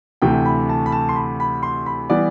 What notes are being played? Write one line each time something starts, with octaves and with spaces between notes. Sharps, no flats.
D2 C3 E3 A3 G5
B5
A5
B5
A5
C6
B5
B5
C6
B5
E3 G3 B3 D5